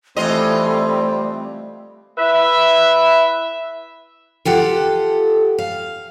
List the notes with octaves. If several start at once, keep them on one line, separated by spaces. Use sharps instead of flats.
E3 G3 A3 C4 F4 D#5
E4 B4 E5
F4 G4 A4 F#5
F5